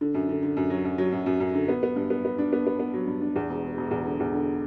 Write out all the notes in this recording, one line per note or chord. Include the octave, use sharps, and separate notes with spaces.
D3
F#2
D3
D3
F#2
F#3
F#2
F#3
F#2
F#2
F#2
D3
B3
B3
G2
B3
B3
D4
B3
B3
B3
F#3
G2
D4
E2
E1
E1
E1
E2
D3
E2
D3